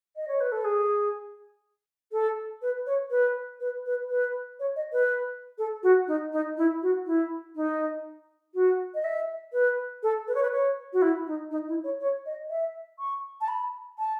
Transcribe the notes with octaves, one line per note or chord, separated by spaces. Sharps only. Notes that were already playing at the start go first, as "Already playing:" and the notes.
D#5
C#5
B4
A4
G#4
A4
B4
C#5
B4
B4
B4
B4
C#5
D#5
B4
A4
F#4
D#4
D#4
E4
F#4
E4
D#4
F#4
D#5
E5
B4
A4
B4
C#5
B4
C#5
F#4
E4
D#4
D#4
E4
C#5
C#5
D#5
E5
C#6
A5
B5
A5